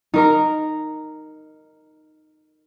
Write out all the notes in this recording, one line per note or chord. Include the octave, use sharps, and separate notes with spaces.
D#4 A#4 A#5